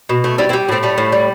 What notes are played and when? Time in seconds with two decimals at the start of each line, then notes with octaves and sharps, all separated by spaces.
0.09 B2
0.24 A3
0.38 G3 C4 E4
0.49 C4 E4
0.53 G3
0.69 A2 A3 C4
0.83 G3 A3
0.98 A2
1.12 G3